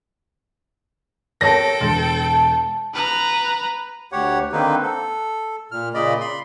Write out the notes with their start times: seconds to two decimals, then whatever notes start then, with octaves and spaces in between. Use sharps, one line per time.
1.41 A4 A#4 C#5 G5 A5 A#6
1.80 E1 C6 A6
2.28 A5
2.94 B4 A#5
4.12 D2 G4 C#5 F#5
4.52 D3 D#3 A#3 C4 D#4 B4
4.83 A4
5.71 A#2 F6
5.94 A#2 C#3 D5 D#5 B5
6.21 B5 C6